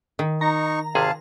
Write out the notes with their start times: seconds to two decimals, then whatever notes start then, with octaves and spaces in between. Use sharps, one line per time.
0.19 D#3
0.41 D#4 A#5 C#6
0.95 G#1 C3 G#4 F5 A5